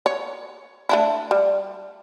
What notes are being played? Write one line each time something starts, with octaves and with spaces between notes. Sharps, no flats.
C#5
A3 D4 E4
G3